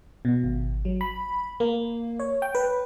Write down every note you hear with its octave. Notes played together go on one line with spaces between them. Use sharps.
B2
G#1
F#3
B5
A#3
C#5
G5
B4